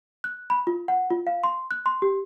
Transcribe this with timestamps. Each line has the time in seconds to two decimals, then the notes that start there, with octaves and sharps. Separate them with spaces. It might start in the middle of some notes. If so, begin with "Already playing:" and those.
0.24 F#6
0.50 B5
0.67 F4
0.88 F#5
1.10 F4
1.27 F5
1.44 C6
1.71 F#6
1.86 C6
2.02 G4